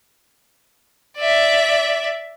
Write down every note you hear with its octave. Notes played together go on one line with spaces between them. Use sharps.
D5 E5